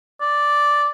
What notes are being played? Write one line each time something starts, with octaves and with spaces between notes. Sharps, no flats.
D5